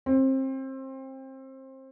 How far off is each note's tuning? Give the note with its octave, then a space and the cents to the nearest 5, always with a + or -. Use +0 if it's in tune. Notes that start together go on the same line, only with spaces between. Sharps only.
C4 +25